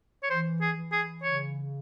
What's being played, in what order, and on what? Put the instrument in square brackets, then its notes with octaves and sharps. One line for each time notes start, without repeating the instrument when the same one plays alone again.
[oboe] C#5
[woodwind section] E3 [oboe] C5
[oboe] G#4
[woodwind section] E3
[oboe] G#4
[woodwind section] C#3 [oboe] C#5